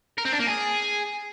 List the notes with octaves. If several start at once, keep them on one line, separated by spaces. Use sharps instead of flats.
A#4
C4
D4
A#3
G#4